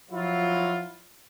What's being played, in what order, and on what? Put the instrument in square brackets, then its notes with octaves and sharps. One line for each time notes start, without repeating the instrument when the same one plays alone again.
[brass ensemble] F3 F#3 E4 F4